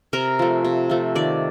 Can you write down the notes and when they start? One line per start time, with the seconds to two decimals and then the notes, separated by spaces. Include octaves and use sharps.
0.13 C3 A#4
0.39 F3 A3
0.65 C3
0.90 F3 A3
1.15 D#3 D5